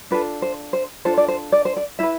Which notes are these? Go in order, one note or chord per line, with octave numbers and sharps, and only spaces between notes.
D4 F4 A4 B4
C5
C5
D4 F4 A4 C5
D5
C5
D5
C5
D5
E4 B4 E5